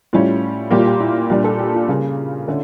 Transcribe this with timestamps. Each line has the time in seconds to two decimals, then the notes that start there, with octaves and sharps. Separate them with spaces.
0.13 A2 G3 C#4 F4
0.71 A#2 G3 A#3 G4
0.78 F4
0.86 G4
1.00 E4
1.30 A#2 G3 D4 G4
1.44 A4
1.59 G4
1.74 F4
1.88 C#3 G3 A#3
2.47 D3 A3 C#4